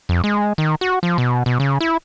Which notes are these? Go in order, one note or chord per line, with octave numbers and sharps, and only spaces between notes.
F2
G#3
D#3
F#4
F3
B2
B2
C#3
E4